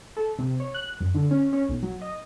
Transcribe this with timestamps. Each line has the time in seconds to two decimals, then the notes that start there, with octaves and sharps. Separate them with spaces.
0.17 A4
0.38 C3
0.60 C#5
0.74 F#6
1.00 F#2
1.15 D3
1.31 C#4
1.53 C#4
1.69 B1
1.82 F#3
2.02 D#5